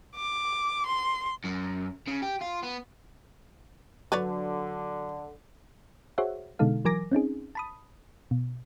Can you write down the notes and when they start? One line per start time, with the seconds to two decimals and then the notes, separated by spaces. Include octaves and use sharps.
0.16 D6
0.86 C6
1.44 F#2
2.07 C#3
2.22 G4
2.41 F4
2.63 B3
4.12 D3 F#3 B4 C#5 D5
6.18 F#4 G#4 C5 C#5 E5 F#5
6.59 B2 D3 G#3 D#4 A4 F5
6.85 E3 F#3 A#4 G#5 D6 A#6
7.12 C4 C#4 D#4 G#4
7.55 A5 B5 D#6
8.31 B2